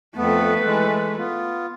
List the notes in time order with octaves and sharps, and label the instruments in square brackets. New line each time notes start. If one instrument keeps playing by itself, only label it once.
[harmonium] F2 B3 [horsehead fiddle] A3 B4
[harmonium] E3 G#3
B3 F4